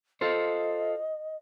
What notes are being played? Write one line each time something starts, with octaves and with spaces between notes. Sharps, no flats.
F4 A4 C5 D#5